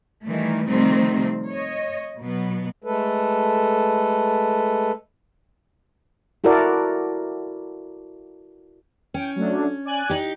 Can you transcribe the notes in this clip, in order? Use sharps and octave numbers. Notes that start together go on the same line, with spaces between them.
D#3 E3 G3 A3
C3 D#3 F3 G3 A3 C4
C#5 D#5
B2 F#3 B3
G#3 A3 A4 B4
E4 F#4 A4 A#4 D5
C#4 G5
F#3 A3 D4
D5 G#5 F#6
D#4 G4